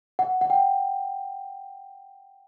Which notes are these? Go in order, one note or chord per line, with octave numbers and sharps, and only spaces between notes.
F#5
F#5
G5